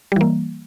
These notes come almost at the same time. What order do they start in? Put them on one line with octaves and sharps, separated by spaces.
G3 E3 A#3